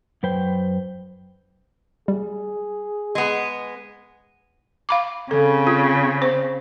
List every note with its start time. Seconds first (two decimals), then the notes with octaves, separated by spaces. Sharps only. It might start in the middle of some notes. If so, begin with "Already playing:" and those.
0.23 F#2 F#3 B4 C5 G5
2.08 G3 G#4
3.15 G#3 B3
4.89 F5 B5 D6
5.31 C#3 C4 A4
5.67 F4
6.22 C5